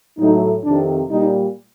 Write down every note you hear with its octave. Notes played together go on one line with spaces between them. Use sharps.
A2 F#3 A3 D#4
F2 C3 D#3 D4
A#2 G3 D#4